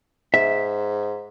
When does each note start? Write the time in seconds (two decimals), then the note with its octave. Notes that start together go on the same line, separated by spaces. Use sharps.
0.34 G#2 E5